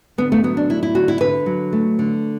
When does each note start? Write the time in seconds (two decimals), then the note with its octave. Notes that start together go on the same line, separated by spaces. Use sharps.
0.18 D3 B3
0.32 A3
0.43 F#3 B3
0.57 D4
0.70 A3 E4
0.83 E4
0.95 D3 F#4
1.08 E4
1.21 D3 B4
1.46 F#3
1.73 A3
1.99 D3